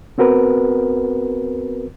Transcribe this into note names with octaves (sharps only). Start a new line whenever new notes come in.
B3 C4 F#4 A#4 B4